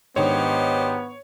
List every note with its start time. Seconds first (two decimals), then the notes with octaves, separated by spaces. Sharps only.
0.16 G#2 D#3 B3 D4 G4 C5 C#5 D#5